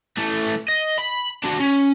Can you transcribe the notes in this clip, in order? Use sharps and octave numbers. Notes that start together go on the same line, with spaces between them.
E3 A3
D#5
B5
D4 F#4
C#4